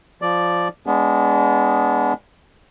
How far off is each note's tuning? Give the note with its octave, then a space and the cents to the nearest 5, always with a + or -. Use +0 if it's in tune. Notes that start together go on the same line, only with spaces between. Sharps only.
F3 +0 D5 +0
G#3 -15 B3 +0 D4 -35